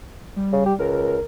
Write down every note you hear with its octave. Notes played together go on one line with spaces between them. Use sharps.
G3
C#3
G4
C#2 A#4